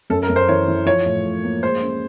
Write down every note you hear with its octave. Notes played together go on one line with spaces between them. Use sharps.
F#2 A4
A#4
F#2
C5
E3 C#5
E3
F3 C#5
A2
A2
A#3
G#3 C5
C#4